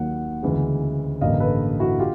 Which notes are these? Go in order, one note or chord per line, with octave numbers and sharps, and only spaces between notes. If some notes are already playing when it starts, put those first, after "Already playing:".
Already playing: D#2 D#3 F#3 A#3 F#5
D2 C#3 E3 G#3
A1 G2 D3 G3 A#3 D#5 F5
A4 B4
E4 F#4
F4 G4